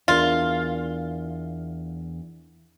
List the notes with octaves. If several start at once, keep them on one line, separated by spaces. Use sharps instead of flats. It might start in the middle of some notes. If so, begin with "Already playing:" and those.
E2 D4 F4 A#4